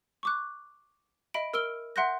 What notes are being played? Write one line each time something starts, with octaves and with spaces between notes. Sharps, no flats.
C#6 D6 F#6
D#5 E5 B5 D7
A#4 E6 F6 D7 G7
E5 F#5 C6 F#6 G6 A#6